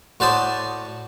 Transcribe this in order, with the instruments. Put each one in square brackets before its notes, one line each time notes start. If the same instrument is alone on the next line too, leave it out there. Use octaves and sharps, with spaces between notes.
[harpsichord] A2 F#4 C5 D5 A5 D#6